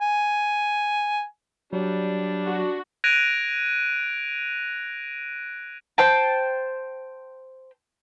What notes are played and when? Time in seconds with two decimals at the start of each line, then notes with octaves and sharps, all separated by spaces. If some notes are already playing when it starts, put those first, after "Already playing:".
0.01 G#5
1.73 F#3 G3 D4
2.45 F#4
3.04 F#6 G#6 A#6 D7 D#7 F7
5.98 C5 G5 A5